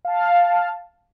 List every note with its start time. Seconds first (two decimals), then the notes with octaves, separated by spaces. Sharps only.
0.05 F5 A5